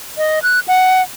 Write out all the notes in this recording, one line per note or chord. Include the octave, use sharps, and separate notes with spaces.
D#5
F#6
F#5